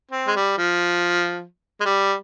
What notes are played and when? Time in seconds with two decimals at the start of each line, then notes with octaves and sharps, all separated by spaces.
0.11 C4
0.27 G#3
0.36 G3
0.58 F3
1.81 G#3
1.85 G3